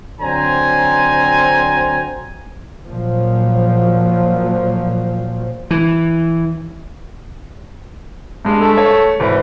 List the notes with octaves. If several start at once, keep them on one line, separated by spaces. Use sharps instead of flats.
D3 F#3 C4 C5 G#5 A#5
A#2 F3 F#3
E3
G2 G#3
A3
C#5
G#1 E3